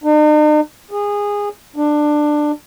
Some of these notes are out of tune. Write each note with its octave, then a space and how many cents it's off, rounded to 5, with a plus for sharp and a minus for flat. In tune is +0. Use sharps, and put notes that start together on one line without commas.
D#4 -45
G#4 -20
D4 +15